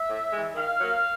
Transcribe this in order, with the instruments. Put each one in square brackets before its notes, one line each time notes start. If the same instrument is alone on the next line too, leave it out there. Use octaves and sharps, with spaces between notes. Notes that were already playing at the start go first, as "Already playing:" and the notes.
Already playing: [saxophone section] E5
A2
E3 G#3
D#3 F5
F#3 A#3